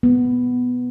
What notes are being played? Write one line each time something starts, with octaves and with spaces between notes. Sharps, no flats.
B3